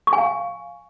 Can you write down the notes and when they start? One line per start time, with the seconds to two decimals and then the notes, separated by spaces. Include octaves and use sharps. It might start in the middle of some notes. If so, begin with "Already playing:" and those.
0.07 C#6
0.13 G#5
0.18 F5